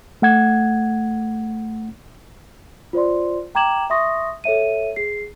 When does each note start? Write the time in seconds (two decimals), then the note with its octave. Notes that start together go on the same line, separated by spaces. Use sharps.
0.22 A3 F#5 G#6
2.93 F4 C5 D5 C6
3.55 G5 A#5 D6 G#6 E7 F#7
3.90 E5 C6 C#6 D#6 A#6
4.44 A4 C#5 E5 D#7
4.96 G#4 C7